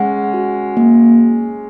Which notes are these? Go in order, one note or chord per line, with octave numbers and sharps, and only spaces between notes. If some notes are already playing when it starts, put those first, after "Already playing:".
Already playing: G#3 C#4 F#5
F#4
A#3